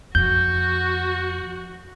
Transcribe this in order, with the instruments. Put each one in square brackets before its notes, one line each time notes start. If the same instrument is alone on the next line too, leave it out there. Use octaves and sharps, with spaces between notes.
[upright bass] F2 [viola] F#4 [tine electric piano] G6